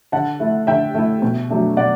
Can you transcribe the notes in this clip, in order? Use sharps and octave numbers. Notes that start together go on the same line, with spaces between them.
D3 F#5 A5
A3 E4
D3 E5 G5
A3 E4
B2
F#3 A3 D4
B2 D5 F#5